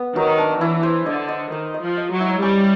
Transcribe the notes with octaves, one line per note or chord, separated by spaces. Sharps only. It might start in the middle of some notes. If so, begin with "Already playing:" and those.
Already playing: B3
D#3 F#3
D4
E3 E4
C5
D3 D#5
D#5
D#3 D#5
D#5
F3
D#5
F#3
E4
G3 C#4